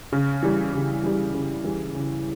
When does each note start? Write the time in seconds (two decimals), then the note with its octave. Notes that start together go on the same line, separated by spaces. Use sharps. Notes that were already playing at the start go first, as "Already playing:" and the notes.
0.13 C#3
0.43 E3 G3
0.73 C#3
1.03 E3 G3
1.35 C#3
1.64 E3 G3
1.95 C#3